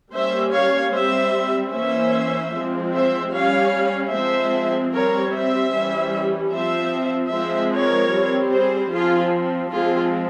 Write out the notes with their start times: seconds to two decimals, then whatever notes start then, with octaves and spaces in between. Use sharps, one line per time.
0.13 G3 A#3 C#4 C5 E5
0.53 C#5 F5
0.93 G3 C4 C5 E5
1.73 E3 A#3 C#4 C5 E5
2.54 F3 G#3 C4
2.94 C5 E5
3.33 G3 C#4 C#5 F5
4.13 F3 G#3 C4 C5 E5
4.93 G3 C4 A#4 C#5
5.33 C5 E5
5.73 E3 G3 C#4
6.52 F3 C4 C5 E5
7.32 F3 G#3 C4 C5 E5
7.73 A#4 C#5
8.13 G3 C4
8.52 G#4 C5
8.92 F3 C4 F4 G#4
9.72 F3 G#3 C4 F4 G#4